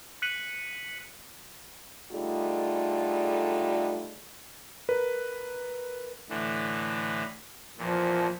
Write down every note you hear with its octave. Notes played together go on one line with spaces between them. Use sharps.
F#6 B6 C#7 D#7 F#7
D3 G3 A3 D#4 F4 G#4
A#4 B4
A2 D3 E3
E2 A#2 F3